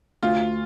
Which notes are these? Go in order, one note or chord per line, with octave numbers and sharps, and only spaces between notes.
D2 F4